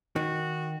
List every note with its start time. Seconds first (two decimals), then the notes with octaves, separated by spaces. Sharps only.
0.16 D#3 F#4